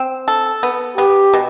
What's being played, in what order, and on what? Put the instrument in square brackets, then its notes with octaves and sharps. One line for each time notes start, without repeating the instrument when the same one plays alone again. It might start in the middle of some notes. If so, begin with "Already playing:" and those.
Already playing: [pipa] C4
A4
B3
[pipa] B3 [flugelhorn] G4
[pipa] B2